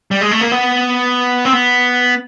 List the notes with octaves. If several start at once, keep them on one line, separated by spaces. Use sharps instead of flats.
G3
G#3
A3
A#3
B3
C4
B3